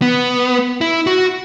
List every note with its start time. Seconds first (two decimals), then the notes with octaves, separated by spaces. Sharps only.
0.02 B3
0.81 E4
1.07 F#4